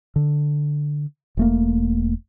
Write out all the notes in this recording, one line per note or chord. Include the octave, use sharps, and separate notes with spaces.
D3
E1 A3 A#3